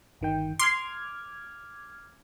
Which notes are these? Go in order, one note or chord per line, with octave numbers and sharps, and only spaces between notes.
G1 D#3 G5
C6 D6 F6 G#6